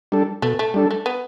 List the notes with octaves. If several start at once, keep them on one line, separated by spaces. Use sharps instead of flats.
G3 D4 A4
B2 A3
A3
G3 D4 A4
A3
B3